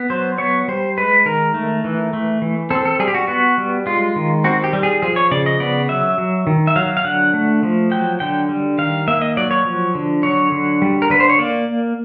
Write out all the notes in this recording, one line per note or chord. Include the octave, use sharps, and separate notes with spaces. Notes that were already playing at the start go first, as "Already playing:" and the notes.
Already playing: B3
F#3 C5
B3 C#5
G3 C5
G#3 B4
D#3 A#4
A3
E3
A3
E3
C4 A4
A4
G3 G#4
G4
F#4
B3 F#4
G3
G#3 F4
D#3
C4 F#4
G4
G3
G#4
F3 G#4
C#5
C#3 D5
D#5
B3 D5
F#3 E5
F#3
D#3
E5
F#3 F5
F5
D3 F#5
A3
F3
F#3 G5
D3 G5
G3
D#3 F5
A#3 E5
D#5
F#3 D5
C#5
F3
D3
F#3 C#5
D3
G3
A#4
D3 B4
C5
C#5
A#3 D5